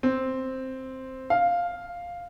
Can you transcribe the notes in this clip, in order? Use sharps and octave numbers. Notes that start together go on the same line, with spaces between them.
C4
F5